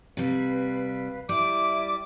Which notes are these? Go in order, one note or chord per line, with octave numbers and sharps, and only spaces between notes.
C3 G3 B4 F5
G3 E4 D5 E5 D6